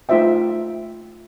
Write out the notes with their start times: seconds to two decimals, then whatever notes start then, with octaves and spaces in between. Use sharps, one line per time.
0.09 A3 D#4 F4 C5 E5 G5